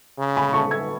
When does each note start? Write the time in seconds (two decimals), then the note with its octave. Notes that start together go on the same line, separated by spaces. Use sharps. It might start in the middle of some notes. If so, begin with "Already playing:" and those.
0.19 C#3
0.37 G#5 B5
0.53 A5 C#6
0.71 E6 G#6